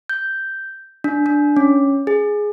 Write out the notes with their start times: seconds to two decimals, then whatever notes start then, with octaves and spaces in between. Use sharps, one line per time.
0.09 G6
1.04 D4
1.26 D4
1.57 C#4
2.07 G#4